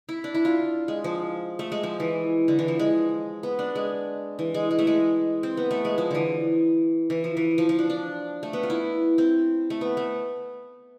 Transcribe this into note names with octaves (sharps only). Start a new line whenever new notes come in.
E4
D4
E4
F4
G#3
F3
A3
G#3
F3
E3
D3
E3
F3
G#3
B3
D4
G#3
E3
G#3
G#3
A3
G#3
C4
B3
A3
G#3
F3
D3 E3
E3
F3
E3
F3
F3
D4
D4
A3
B3
F4
E4
C4
A3
B3
A3